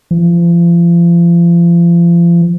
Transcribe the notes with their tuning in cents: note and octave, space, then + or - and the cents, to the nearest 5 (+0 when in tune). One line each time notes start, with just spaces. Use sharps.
F3 -35